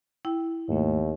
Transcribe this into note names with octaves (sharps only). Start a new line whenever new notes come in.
E4 G5
D#2 G#2 A3